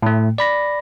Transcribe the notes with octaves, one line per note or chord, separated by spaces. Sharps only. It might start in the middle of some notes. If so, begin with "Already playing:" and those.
A2 A3
D5 B5 A#6